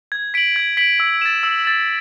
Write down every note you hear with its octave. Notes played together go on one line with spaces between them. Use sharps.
G#6
B6 D7 F#7
G#6
B6 D7 F#7
E6
A6 E7
E6
A6 E7